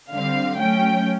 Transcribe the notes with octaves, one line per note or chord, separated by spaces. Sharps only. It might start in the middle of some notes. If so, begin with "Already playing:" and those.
D3 G3 C4 F5
F#3 A3 C#4 G5